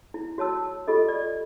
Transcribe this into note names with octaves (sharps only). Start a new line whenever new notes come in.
E4
F#4 C#5 A5 E6
F4 G4 A4 D#5
D5